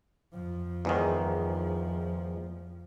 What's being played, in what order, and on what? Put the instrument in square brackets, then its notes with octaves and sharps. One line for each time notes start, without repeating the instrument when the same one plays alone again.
[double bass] F2 F3
[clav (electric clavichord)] E2 G#2 D#3